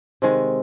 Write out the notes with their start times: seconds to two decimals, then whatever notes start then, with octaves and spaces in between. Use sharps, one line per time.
0.22 C3 D#3 G#3